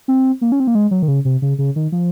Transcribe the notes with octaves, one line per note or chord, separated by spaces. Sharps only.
C4
A#3
C#4
C4
A#3
G#3
F#3
D#3
C#3
C3
C#3
C#3
D#3
F3